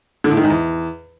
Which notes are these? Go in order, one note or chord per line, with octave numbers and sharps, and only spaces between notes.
D3
A2
D#3
G#2
E2